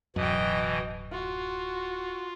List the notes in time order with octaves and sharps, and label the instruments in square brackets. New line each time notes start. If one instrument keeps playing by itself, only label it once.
[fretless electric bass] D1 F#2 [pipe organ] B2 E3 [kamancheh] D#5 G5
[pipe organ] F4 [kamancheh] F#4